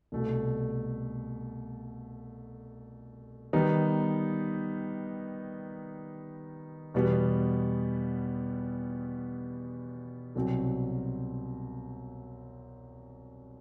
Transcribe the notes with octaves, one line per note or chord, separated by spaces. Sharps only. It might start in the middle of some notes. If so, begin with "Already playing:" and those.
C2 B2 A3
D#3 G3 B3 D#4
E2 B2 G3 B3
C2 B2 F#3 C4